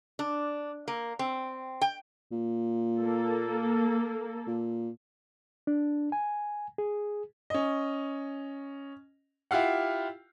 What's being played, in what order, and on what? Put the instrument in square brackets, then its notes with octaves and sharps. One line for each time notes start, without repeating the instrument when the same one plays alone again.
[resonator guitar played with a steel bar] D4
A#3
C4
G5
[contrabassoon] A#2
[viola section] A#3 A4
[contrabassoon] A#2
[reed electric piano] D4
G#5
G#4
[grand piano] C#4 D#5
E4 F4 G4 F5 F#5